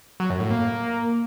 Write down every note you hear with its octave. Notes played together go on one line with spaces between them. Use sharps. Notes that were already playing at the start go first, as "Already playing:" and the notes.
F#3
F#2
A2
A#3